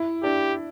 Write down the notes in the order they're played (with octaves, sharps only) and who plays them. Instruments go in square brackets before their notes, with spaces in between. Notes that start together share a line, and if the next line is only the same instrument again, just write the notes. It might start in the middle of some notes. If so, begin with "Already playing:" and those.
Already playing: [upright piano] E4
[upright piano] D4 [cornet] G4